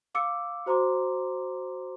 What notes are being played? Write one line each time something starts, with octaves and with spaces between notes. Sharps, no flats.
F5 D6 E6 C#7
F#4 C5 A#5 C6 D6